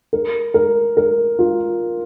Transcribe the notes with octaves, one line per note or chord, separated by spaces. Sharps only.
A#4
A#4
A#4
F4